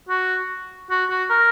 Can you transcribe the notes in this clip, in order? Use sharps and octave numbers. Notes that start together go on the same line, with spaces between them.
F#4
F#4
F#4
A#4